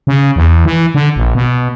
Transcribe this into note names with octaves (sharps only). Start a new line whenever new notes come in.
C#3
E2
E3
D3
A#1
B2